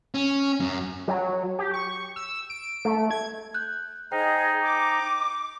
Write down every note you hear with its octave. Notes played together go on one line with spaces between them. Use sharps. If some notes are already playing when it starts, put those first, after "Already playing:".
C#4
F#2
F#3
G4
C#6
E6
D7
A3
G#6
F#6 G6
D#4 G#4 C5 D#5 G5
D6